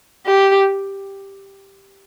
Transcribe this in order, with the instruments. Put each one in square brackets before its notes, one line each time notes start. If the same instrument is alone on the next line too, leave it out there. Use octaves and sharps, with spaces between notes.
[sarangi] G4